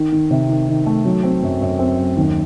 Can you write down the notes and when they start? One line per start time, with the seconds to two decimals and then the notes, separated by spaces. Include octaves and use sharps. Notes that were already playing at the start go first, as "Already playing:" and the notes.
Already playing: D#3
0.12 D#3
0.31 C3
0.49 D#3
0.68 D#3
0.86 A3
1.05 F#3
1.23 C4
1.43 F#2
1.61 F#2
1.79 C4
1.98 F#2
2.17 D#2